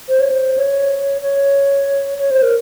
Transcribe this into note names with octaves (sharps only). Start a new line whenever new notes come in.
C5
C#5
C5
C#5
C#5
C#5
C5
A#4